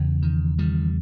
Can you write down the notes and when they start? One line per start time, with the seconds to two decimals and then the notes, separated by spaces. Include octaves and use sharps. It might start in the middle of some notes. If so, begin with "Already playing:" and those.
Already playing: E2 C#3
0.22 D#3
0.58 D#3 G3